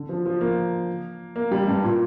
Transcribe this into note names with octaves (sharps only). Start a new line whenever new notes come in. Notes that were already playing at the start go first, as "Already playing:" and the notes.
Already playing: D3
F3
F3
A#3
A#3
G3
G2
A#2